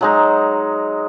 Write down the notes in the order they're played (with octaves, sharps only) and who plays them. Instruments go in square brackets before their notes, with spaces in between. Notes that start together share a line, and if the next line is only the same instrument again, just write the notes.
[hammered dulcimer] F#3 G#3 D#4